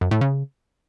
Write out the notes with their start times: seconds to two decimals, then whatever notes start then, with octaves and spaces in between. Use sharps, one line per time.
0.01 F#2
0.11 A2
0.21 C#3